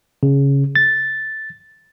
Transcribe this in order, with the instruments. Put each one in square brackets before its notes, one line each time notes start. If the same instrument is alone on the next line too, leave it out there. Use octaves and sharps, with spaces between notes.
[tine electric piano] C#3
A6